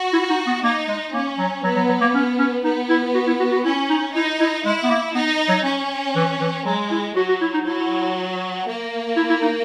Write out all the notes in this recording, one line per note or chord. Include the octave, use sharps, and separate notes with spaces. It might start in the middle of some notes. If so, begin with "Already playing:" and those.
Already playing: F#4
E4
D#4
B3
A#3 D#4
G#3
A#3 C#4
F#3
F#3 B3
F#3
F#3
A#3
C#4
C#4
B3 D#4
E4
F#4
E4
F#4
F#4
C#4 E4
D#4
D#4 E4
E4
G#3 E4
B3
A#3
B3 D#4
F#3
C#4
E3
E3
F#3 G#3
E4
F#3 F#4
F#4
E4
D#4
F#3 E4
A#3
E4
E4
D#4